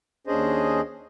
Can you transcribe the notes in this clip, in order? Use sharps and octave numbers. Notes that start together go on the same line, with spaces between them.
D#2 C#4 D4 G#4 C5 D#5